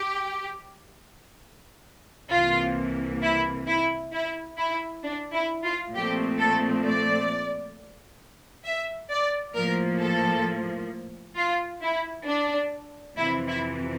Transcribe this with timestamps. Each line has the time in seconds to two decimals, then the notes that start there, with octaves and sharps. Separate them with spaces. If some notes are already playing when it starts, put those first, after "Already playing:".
Already playing: G4
2.32 C2 C3 E3 A#3 F4
3.23 E4
3.68 E4
4.13 E4
4.58 E4
5.04 D4
5.33 E4
5.64 F4
5.94 A#2 F3 A3 C4 G4
6.39 A4
6.85 D5
8.65 E5
9.11 D5
9.55 A2 F3 A#3 A#4
10.01 A4
11.37 F4
11.82 E4
12.26 D4
13.17 F2 C3 E3 E4
13.47 E4